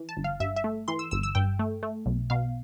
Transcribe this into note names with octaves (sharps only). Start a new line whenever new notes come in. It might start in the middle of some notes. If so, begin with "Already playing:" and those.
Already playing: E3
A5
G1
F5
G2 E5
E5
A3
E3 C6
E6
G1 E6
E6
G2 G5
A3
A3
B1
B2 F5